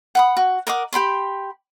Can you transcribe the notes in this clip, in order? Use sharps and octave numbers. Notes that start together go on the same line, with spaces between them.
F#5 B5 D#6
F#4
A#4 D#5 F#5 D6
G4 G5 B5 C6